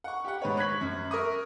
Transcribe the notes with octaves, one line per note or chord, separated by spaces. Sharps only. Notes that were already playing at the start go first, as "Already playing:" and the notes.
F#5 C#6
G4 F#5
G#2 B4 C#5
C#6 F#6 G#6 B6 F#7
F#2
A#4 E5 C#6 D#6